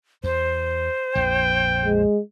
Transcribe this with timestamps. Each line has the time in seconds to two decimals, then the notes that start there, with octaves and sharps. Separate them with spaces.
0.24 E2 C5
1.15 A#1 F2 G5
1.86 G#3